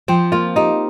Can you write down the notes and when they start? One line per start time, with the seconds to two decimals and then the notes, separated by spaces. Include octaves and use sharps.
0.08 F3 C4
0.32 A#3 F4
0.56 D#4 G4